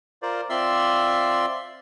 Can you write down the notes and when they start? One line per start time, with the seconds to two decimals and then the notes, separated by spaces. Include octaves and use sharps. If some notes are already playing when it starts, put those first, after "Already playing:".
0.22 F4 A#4 C5 D5
0.50 C4 F4 D5 E5 C6 E6